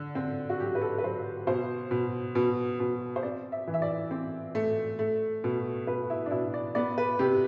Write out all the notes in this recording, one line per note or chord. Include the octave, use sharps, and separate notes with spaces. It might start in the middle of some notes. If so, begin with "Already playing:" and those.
Already playing: D3
C4
F#4
F#3 G4
B4
A4
B4
F#3 C5
B2 C5
B2
B2
B2
C5
C4 D5
E5
E3
E5
D5
C4
A3
A3
B2
B2 B4
E4
D4
B2 E4
D5
B3 D5
B4
C3 G4